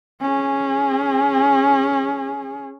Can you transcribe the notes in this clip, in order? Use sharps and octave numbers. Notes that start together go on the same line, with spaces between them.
C#4 G#4